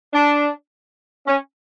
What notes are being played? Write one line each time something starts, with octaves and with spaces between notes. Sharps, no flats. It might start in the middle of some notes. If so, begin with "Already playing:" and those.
D4
C#4